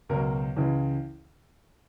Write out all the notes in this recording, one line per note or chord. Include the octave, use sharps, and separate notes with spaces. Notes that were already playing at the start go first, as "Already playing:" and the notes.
C#2 B2 F#3 A#4
C#2 C#3 E3